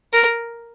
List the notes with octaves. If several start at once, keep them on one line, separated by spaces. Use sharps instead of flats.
A#4